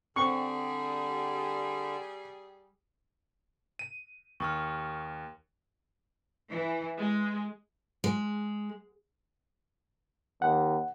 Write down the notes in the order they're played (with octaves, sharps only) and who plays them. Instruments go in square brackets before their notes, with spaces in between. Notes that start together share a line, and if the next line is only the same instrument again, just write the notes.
[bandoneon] D3 [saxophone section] G3 G#4 [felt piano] C4 [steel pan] C#6
[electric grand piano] D#7
[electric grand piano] D#2 [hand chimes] C#6 D#6 F6
[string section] E3
G#3
[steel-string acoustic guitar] G#3
[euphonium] D#2 [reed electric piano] F#5